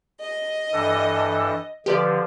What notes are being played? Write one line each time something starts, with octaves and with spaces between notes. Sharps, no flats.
D#5
G2 E3 A4
D3 F3 G4 B4 D5